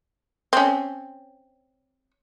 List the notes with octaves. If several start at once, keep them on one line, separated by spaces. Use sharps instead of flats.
C4 C#4